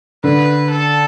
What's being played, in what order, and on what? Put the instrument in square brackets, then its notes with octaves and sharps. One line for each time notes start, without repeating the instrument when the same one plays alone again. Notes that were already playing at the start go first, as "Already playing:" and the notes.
[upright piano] D3 [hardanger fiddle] B4
[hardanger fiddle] A4